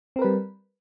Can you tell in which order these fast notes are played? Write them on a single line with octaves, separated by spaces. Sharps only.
C4 A#4 B4 G3